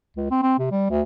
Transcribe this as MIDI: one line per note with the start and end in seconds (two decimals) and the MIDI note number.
0.17 0.27 37
0.31 0.38 60
0.42 0.57 60
0.59 0.71 48
0.71 0.88 55
0.90 1.02 38